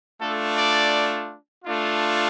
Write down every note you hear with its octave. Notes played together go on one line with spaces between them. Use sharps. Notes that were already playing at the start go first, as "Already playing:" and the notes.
A3 D4 F4 A4
D5
A3 D4 F4